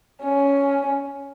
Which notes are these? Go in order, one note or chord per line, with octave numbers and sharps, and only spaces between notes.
C#4